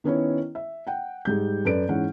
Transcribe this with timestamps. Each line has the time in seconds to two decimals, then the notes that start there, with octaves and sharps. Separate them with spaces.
0.04 D#3 B3 C#4 E4 C#5
0.55 E5
0.87 F#5 G5
1.25 G#2 G3 G6
1.65 F#2 A4 B4 D5 D7
1.89 G#2 E3 C#4 F#5